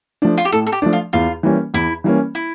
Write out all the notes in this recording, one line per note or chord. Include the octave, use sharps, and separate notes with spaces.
F3 A3 D4
F4
G4
A2 A4
A4
G4
F3 A3 D4
F4
E2 F4
E3 G3 A#3 C#4
E2 E4
E3 G3 A#3 C#4
E4